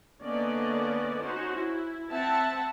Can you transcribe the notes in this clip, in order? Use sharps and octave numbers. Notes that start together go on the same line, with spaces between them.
D3 A#3 B3 C#4 D5 D#5
C#4 D#4 F#4 C5
E4
C4 E5 F#5 A5